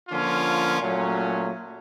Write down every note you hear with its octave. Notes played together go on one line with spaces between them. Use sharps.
D3 F3 A#3 C#4 F4
A#2 F#3 A3 C#4